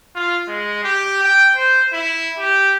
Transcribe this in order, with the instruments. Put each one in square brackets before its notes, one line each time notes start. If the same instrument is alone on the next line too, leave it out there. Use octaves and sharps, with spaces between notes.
[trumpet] F4
G#3
G4
G5
C5
E4
G4